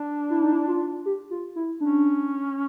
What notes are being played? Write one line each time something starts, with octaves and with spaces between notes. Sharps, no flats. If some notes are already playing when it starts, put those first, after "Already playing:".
Already playing: D4
E4
D#4
E4
F4
G4
F4
E4
C#4 D4